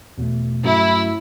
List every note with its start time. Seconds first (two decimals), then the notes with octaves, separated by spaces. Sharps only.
0.18 E2 B2 A3
0.64 G2 F#3 A3 C#4 E4 F#4